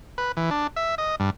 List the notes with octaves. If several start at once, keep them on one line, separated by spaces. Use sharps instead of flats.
B4
E3
D4
E5
D#5
G2